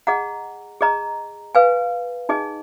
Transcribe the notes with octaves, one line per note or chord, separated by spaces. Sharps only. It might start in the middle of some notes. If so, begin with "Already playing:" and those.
G#4 D#5 F#5 A#5
G#4 D#5 A#5
B4 F5 G#5
D#4 G#4 D#5 G#5